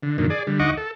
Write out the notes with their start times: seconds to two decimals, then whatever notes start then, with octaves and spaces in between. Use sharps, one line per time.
0.03 D3
0.18 F#2 A#2 D3 D#3
0.30 G#4 D5
0.47 D3 G3
0.59 D2 D#4 D#5 F#5 C#6 D6
0.77 A4